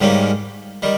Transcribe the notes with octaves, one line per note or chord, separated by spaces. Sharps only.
G#2 D#3 G3 A#3 C#4
D#3 G3